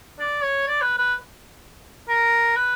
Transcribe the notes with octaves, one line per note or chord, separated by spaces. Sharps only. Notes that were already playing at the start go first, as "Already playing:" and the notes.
D5
C#5
D5
B4
B4
A#4
B4